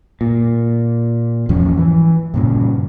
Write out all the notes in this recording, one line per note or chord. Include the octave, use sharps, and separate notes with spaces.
A#2
E2 G#2 F3 C#4
E3
G2 A#2 C#3